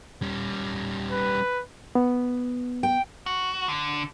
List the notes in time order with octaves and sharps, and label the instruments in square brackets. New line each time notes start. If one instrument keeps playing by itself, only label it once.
[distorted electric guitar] G3 C#4
[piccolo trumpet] B4
[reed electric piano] B3
[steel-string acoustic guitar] G5
[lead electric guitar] F#4
D3